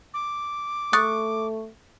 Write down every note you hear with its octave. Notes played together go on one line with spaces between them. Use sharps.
D6
A3 C#6 D#6 F#6 A6